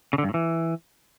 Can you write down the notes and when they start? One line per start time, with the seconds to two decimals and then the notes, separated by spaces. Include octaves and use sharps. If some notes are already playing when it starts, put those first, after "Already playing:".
0.13 C#3
0.18 D3
0.24 G2
0.29 A2
0.34 E3